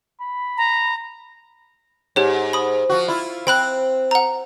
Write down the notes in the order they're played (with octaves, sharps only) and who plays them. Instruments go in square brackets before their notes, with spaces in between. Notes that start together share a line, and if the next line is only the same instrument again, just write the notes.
[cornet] B5
[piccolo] A#5
[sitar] G#2 [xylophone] G4 C#5
[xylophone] B5 D#6
[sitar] F3 F#4
E4 F4
[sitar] C4 [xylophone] G5 B5 F#6
[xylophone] F#5 A#5